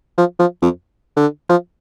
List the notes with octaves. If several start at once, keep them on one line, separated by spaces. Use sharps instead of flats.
F3
F3
F2
D3
F3